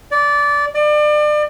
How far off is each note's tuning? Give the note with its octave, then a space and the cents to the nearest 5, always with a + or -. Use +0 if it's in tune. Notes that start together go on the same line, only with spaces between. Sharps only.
D5 -15
D5 +35